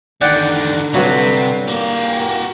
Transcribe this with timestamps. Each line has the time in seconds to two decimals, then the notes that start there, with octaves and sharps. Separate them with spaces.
0.21 E2 D3 D#3 D5 F#5 G5
0.94 G2 C3 F#3
1.68 A#3 F#4 G4